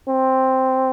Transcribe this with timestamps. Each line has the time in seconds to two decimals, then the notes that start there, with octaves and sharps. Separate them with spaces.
0.08 C4